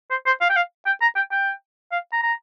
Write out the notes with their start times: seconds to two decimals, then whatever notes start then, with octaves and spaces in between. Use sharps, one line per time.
0.10 C5
0.26 C5
0.41 F5
0.50 G5
0.56 F5
0.86 G5
1.01 A#5
1.16 G5
1.32 G5
1.92 F5
2.12 A#5
2.23 A#5